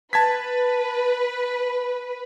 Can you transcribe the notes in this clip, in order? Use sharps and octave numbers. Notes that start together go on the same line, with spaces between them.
B4 A5 G#6 B6